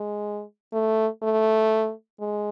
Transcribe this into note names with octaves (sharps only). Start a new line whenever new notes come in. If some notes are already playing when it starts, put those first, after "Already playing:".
Already playing: G#3
A3
A3
G#3